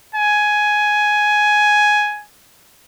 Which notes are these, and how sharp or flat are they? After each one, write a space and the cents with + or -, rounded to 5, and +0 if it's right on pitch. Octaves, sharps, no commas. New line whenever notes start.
G#5 +10